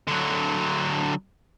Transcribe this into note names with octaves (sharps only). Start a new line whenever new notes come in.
D3 F#3